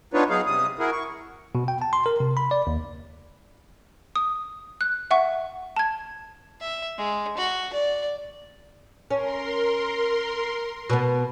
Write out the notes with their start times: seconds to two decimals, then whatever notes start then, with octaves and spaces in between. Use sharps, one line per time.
0.14 B3 D4 D#4 F4 B4 C#5
0.30 F#3 B3 D#4 G#4 F5
0.46 C3 G3 D#6
0.79 E4 F#4 G#4 A#4
0.92 C#6
1.55 B2
1.68 G5
1.82 A5
1.93 C6
2.06 A#4
2.20 C3
2.37 B5
2.51 D5
2.67 D#2
4.16 D#6
4.81 F#6
5.11 E5 F#5 C#6
5.76 A5 G#6
6.61 E5
6.98 G#3
7.37 F#4
7.73 D5
9.11 C#4 A#4 C6
10.90 B2 B3